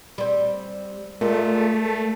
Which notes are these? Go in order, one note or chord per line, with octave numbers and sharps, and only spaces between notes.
G3 C4
A#2 G#3 A3